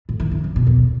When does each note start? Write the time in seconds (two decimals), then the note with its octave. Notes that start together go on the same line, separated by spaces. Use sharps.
0.09 A2
0.20 E3
0.32 D3
0.44 C#3
0.56 B2
0.67 E2